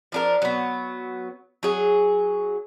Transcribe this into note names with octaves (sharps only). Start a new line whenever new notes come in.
F3 D4 A#4
F#3 B3
F#3 G#4